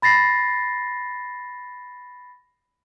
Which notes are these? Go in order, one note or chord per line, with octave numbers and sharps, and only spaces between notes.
B5 A6 A#6 C7